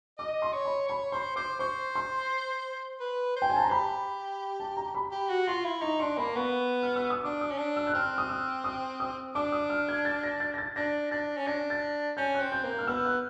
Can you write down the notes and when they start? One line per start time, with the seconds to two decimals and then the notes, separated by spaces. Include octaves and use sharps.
0.18 D#5 D6
0.42 C6
0.53 C#5
0.65 B5
0.89 C#5 B5
1.12 C5 C6
1.36 C5 D6
1.59 C5 C#6
1.95 C6
3.00 B4
3.36 C5
3.42 G5
3.50 G#5
3.56 A5
3.64 A#5
3.71 G4 B5
4.60 A5
4.77 A#5
4.95 B5
5.12 G4
5.29 F#4
5.48 F4 C6
5.64 E4
5.82 D#4 C#6
6.00 D4 C6
6.18 A#3 B5
6.36 B3 C#6
6.83 F6
6.96 E6
7.10 D#6
7.23 D4 D6
7.41 D#6
7.51 C#4
7.58 D4
7.77 E6
7.87 F#6
7.94 C4 F6
8.18 D#6
8.29 E6
8.64 D#6
9.00 D#6
9.35 D4 D6
9.52 D#6
9.70 F6
9.89 G#6
10.05 A6
10.23 A#6
10.40 A6
10.54 A#6
10.58 A6
10.76 D4 A#6
11.11 D4 A6
11.37 C#4
11.47 D4 A#6
11.70 A6
12.17 C#4 G6
12.34 F#6
12.40 C4
12.52 G6
12.64 A#3
12.70 G6
12.79 F6
12.88 B3 E6
13.05 F#6